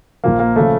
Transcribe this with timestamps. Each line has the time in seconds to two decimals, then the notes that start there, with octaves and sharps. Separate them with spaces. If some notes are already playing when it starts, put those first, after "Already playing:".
0.24 A#1 A#2 F3 A#3
0.39 A#3
0.56 C#3 F3 A3